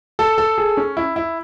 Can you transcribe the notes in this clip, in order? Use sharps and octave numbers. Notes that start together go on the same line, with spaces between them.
A4
A4
G#4
C#4
E4
E4